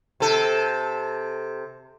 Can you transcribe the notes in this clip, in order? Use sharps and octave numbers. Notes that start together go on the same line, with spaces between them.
C3 A4